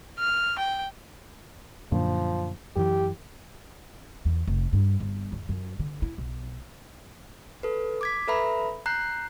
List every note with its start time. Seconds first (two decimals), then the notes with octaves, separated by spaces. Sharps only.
0.19 F6
0.59 G5
1.92 F#2 A#2 D3 F3
2.76 F#2 E3 G4
4.25 E2
4.47 F1
4.73 G2
5.00 G1
5.32 E2
5.49 F#2
5.79 D3
6.02 E4
6.18 B1
7.63 A4 B4
8.01 D6 G#6 B6
8.27 A4 B4 E5 A#5 B5
8.86 A#5 F#6 G6 C7